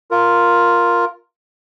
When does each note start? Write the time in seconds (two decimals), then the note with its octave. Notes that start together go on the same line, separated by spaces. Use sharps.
0.11 F4 A#4